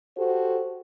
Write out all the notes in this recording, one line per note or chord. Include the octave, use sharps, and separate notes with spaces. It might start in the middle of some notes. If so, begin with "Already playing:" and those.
F#4 G4 A4 C5